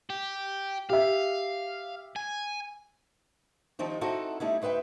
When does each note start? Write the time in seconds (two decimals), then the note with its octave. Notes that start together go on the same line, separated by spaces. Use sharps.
0.10 G4
0.90 G4 E5 F5
2.16 G#5
3.79 D#3 F3 G3 C4 D#4
4.01 C4 D#4 E4 F#4 A4
4.40 G3 A3 D#4 E4
4.62 D2 D#4 B4 E5 G5